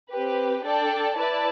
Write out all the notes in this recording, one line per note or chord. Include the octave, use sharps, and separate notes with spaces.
C4 G4 B4
D4 A4 D5 G5
E4 B4 D5 A5